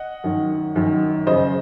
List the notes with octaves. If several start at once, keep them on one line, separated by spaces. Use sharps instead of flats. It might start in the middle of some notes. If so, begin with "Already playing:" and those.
Already playing: D#5 F#5
F#2 D#3
F#2 D#3
F#2 C#3 C5 D#5